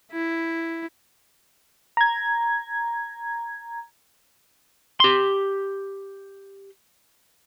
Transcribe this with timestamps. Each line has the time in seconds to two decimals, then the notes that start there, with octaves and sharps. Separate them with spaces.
0.11 E4
1.97 A#5 G#6
5.00 G4 C6